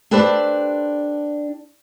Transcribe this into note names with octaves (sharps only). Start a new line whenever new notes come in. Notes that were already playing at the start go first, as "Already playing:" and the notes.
D4 G4 A4 B4 C5 D5